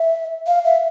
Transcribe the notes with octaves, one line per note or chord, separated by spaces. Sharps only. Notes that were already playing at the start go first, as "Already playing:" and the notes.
Already playing: E5
F5
E5